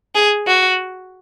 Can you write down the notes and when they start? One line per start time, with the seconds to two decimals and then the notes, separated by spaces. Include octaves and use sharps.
0.15 G#4
0.47 F#4